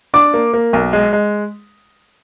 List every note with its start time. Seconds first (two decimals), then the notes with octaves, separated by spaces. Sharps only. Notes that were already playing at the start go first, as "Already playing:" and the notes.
0.14 D4 D6
0.34 A#3
0.53 A#3
0.73 B1
0.93 G#3
1.13 G#3